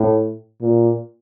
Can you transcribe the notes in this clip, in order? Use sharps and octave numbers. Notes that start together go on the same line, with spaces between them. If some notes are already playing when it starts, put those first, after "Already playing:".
Already playing: A2
A#2